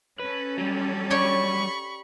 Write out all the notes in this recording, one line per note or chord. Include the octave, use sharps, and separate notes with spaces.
C#4 A4 B4
F#3 G3
G4 C#5 D5 B5 C#6